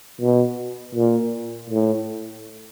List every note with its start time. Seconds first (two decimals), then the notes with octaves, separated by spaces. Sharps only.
0.21 B2
0.95 A#2
1.70 A2